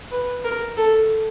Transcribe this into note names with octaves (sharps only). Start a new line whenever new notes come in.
B4
A#4
A4